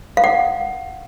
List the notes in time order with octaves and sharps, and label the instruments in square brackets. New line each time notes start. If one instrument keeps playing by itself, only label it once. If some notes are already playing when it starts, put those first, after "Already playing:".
[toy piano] F5
F#5